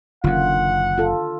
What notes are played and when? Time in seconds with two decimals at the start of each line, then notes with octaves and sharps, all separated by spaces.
0.24 F#1 F#2 D3 D#3 F4 F#5
0.98 F4 A4